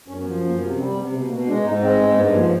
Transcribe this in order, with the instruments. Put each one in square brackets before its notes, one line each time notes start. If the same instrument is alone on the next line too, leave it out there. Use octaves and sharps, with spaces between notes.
[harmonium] F#2 C#4
B3
F3
F#2 A#3
C3 B3
G3 C4
C3 B3
B2
B2 A#3
G#3 D4
G#2 D#4
G#3 C4
G#2 C4
G2 B3
F3 A#3